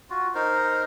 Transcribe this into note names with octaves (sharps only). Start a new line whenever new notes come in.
F4 F#4
D#4 A#4 C5